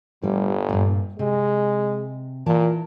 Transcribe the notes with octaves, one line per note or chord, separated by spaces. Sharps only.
G1 A2 G3
G2 A#2
C3 G#3
A#2 E3 A#4 A5